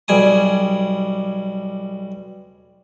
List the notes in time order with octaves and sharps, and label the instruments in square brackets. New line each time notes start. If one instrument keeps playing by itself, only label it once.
[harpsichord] B1 G3 G#5 D#6